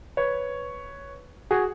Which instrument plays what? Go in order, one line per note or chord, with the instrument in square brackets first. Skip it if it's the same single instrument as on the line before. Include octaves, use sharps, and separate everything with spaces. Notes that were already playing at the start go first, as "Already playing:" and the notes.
[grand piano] B4 C#5
F#4 G#4